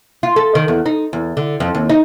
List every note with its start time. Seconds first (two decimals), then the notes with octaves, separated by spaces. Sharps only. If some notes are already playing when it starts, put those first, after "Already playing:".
0.23 F4
0.36 A4
0.55 D#3
0.68 E2
0.86 D#4
1.13 E2
1.37 D3
1.60 F2
1.75 D#2
1.89 D#4